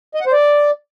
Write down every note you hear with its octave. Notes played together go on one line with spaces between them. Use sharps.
D#5
F#5
C5
D5